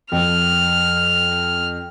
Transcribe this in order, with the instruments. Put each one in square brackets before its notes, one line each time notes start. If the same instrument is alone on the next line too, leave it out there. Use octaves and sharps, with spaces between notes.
[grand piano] F2 [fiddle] F6